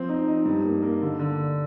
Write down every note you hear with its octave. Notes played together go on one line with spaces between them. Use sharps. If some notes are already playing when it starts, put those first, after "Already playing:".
Already playing: F3 C4
D#4
D#4
G2
A#3
A#3
D3
D3